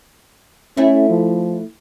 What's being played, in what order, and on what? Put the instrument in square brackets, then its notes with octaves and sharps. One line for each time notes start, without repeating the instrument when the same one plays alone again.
[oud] A3 E4 [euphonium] C#4
[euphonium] F3